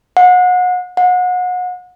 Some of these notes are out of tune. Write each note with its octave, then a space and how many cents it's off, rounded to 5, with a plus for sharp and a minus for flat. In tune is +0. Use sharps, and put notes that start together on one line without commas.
F#5 -30
F#5 -30